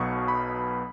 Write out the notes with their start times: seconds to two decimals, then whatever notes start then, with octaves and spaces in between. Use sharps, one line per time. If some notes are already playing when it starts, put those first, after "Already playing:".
Already playing: B1 B2 F#3 B3 C#6
0.28 B5